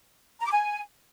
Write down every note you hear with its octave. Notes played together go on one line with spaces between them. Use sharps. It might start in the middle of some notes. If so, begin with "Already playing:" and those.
A#5
D6
G#5